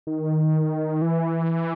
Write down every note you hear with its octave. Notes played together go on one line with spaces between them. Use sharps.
D#3
E3